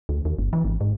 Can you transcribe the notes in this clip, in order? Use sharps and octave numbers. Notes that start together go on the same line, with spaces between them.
D2
D#2
G1
E3
G#1
G#2